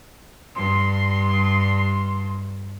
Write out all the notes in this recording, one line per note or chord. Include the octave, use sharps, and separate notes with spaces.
G2 C6